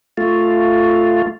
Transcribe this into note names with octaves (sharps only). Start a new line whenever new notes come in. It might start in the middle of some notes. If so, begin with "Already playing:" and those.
A3 F4